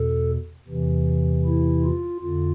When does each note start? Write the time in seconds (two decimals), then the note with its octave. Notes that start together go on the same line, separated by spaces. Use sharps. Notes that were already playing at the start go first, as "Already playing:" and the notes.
Already playing: E2 B2 A4
0.68 E2 C3 E3
1.45 E4
1.83 F4
2.22 F2 D3 F4